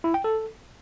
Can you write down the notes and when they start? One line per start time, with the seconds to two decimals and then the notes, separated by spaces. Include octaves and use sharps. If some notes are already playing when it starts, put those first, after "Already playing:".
0.04 E4
0.14 G5
0.24 A4